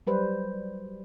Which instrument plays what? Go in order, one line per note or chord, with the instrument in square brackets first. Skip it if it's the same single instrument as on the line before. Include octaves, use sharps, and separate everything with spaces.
[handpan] F#3 G3 B4 C5